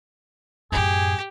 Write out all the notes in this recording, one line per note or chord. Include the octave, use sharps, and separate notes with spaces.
F#2 A2 G4 G#4